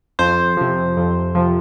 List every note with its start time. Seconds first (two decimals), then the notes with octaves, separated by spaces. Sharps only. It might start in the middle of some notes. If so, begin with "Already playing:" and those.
0.19 F2 C5
0.57 C3 F3
0.97 F2
1.35 C3 F3